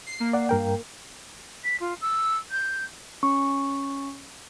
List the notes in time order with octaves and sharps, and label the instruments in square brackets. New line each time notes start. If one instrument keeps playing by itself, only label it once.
[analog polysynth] C7
A#3
[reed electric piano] D5 F#5
G2 A#4 G5
[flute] B6
F4
E6
G6
[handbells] C#4 C#6